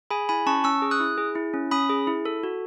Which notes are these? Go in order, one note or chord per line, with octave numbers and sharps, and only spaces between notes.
G#4 G#5 B5
E4 G#5 B5
C#4 A5 C#6
C#4 C#6 E6
G#4
D#6 F#6
E4
G#4
E4
C#4
C#4 B5 D#6
G#4
E4
A4
F#4